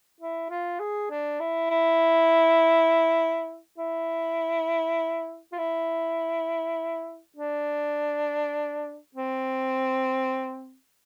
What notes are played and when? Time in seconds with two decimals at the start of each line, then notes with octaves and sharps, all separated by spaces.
0.21 E4
0.50 F4
0.79 G#4
1.10 D4
1.40 E4
1.70 E4
3.78 E4
5.52 F4
5.58 E4
7.36 D4
9.15 C4